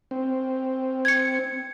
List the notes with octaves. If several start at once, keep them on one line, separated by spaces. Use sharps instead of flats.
C4
G#6 C#7